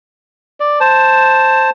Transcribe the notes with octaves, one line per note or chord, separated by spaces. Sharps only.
D5
C5 A5